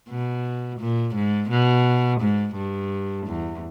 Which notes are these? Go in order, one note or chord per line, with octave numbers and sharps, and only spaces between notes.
B2
A#2
G#2
B2
G#2
G2
E2